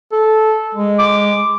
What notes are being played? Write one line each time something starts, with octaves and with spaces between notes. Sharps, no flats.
A4
G#3
D6